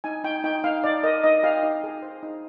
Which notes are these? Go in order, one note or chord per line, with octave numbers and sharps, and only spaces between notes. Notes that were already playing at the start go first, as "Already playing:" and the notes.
D#4 G#5
D#4 G5
D#4 G5
D#4 F5
D#4 D5
A#4 D#5
D#4 D#5
G4 F5
D#4
G#4
C5
D#4